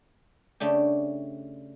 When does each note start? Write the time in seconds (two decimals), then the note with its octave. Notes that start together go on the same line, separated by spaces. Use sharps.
0.60 C#3 A3 D4 G4